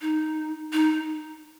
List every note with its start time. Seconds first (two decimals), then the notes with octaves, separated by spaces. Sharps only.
0.01 D#4
0.73 D#4